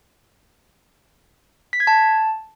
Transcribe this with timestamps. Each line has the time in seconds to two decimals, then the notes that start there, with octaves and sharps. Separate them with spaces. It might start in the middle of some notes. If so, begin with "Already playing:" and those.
1.73 B6
1.80 G#6
1.87 A5